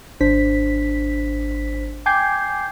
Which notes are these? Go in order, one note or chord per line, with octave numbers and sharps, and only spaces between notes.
G#1 D4 C5 B6
G5 G#5 D6 G6 G#6 C7